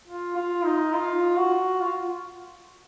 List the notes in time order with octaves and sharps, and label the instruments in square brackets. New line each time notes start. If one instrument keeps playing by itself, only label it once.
[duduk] F4
F4
D#4
F4
F#4
F4